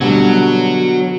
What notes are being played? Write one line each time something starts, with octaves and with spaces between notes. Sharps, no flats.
B2 D3 F#3 G3